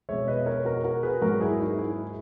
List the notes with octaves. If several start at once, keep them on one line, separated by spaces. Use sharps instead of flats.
B2 G#3 C#5 E5
B4 D#5
A#4 C#5
F#4 A#4
F#4 A#4
G#4 B4
G#2 F#3 A#3 F#4 A#4
E4 G#4
D#4 F#4
E4 G#4